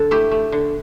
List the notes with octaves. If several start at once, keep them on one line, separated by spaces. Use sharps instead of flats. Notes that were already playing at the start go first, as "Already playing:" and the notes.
Already playing: D3 A4
A3 E4 G4
A3
D3